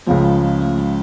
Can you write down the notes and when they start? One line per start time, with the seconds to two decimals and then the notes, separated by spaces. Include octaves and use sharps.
0.07 C#2 C#3 F3 A3
0.25 G#3
0.43 G#3
0.61 A3
0.79 G#3